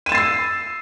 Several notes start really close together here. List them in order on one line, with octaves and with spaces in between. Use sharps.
D#7 E7 A6 C7 E6